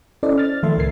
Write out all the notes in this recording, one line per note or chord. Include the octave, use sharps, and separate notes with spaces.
C#4 E4 A4 C5 D5 D#5
F6 A6
D#3 F3 A3 A4 E5 C6
C#2 A2 A#4 G#6 C7